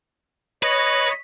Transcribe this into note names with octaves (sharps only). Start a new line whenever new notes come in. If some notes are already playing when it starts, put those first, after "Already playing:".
B4 C#5 D#5